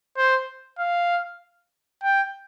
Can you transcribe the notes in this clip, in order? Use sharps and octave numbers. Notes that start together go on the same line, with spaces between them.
C5
F5
G5